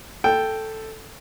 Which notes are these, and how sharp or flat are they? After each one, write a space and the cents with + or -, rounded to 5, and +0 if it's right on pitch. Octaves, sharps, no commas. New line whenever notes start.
A4 +0 G5 +0